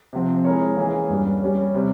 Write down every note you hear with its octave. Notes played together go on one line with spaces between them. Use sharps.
C3 F3 C4
G#3 E4 A#4 C#5
E3 A#3 C#4 E4 G#4
G2 G3 C#4
G3 C#4 G4 C#5
C3 G3 C4